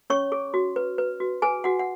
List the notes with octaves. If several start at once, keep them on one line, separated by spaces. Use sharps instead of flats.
C#4 C#5 C#6
G#4
F#4
B4
B4
F#4
G#4 B4 G#5
F#4 F#5
F#5